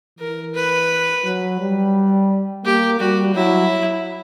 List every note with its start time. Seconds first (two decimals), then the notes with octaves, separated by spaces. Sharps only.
0.19 E3 A#4
0.55 B4
1.24 F#3
1.60 G3
2.64 A#3 G4
3.00 G3 F#4
3.35 F#3 E4